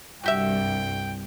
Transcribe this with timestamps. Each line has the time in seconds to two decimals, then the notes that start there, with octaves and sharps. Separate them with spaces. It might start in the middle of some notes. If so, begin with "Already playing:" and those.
0.24 C2 G2 F#4 G4 E5 G5